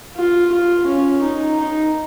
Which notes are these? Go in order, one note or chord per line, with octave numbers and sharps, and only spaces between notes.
F4
F4
C#4
D#4
D#4